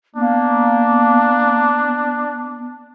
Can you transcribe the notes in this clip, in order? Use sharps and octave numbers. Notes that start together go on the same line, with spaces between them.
A#3 B3 D4